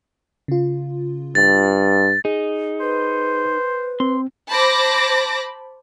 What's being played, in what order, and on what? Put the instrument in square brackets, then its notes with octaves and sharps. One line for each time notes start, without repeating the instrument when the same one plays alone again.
[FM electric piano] C#3 F4
[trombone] G2 [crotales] A6
[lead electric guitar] D#4 [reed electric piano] G#4
[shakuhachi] B4 [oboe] C5
[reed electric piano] C4 [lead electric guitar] C6
[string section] C5 A5 B5 D6 A#6